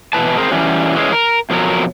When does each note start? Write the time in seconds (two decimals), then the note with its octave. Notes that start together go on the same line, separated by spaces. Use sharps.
0.13 B2 E3 C#4 E4 B4 A5
0.38 C4 G#4 A#4 C5
0.52 E3 F#3 G3 C#4
0.95 E3 G#3 A#3 C#4
1.13 A#4
1.50 F2 B2 F3 F#3 A#4